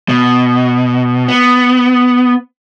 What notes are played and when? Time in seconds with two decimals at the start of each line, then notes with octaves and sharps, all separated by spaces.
0.09 B2
1.28 B3